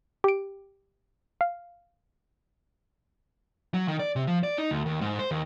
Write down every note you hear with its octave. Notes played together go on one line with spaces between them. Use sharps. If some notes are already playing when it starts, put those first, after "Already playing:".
G4 D7
F5
F#3
D#3
D5
C3
F3
D5
D#4
D2
D#2
G#2
C5
D#2